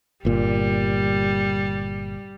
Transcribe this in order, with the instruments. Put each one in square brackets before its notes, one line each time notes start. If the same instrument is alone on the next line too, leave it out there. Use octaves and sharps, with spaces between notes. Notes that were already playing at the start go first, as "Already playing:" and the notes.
[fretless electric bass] G1 A#2 [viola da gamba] G3